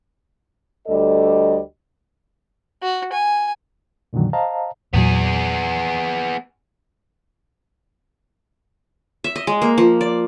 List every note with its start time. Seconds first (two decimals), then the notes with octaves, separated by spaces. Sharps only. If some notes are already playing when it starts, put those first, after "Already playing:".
0.87 D2 G3 A4 D5 D#5
2.83 F#4
3.13 G#5
4.13 F2 A#2 D3 D#3 F#3
4.33 C5 D#5 F5 A5 A#5
4.93 E2 A#2 F#3 B3 G#4
9.24 E5
9.36 D#5
9.47 G#3
9.62 A#3
9.78 F3
10.01 D5